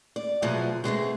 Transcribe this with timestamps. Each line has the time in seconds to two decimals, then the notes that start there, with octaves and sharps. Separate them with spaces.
0.16 D5
0.42 B2 D3 F3 F#3 A3 G#4
0.84 B2 G#3 A3 C4